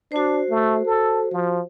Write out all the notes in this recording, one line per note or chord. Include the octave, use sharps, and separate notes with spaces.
D4 F#4 C5
A3
A4
F3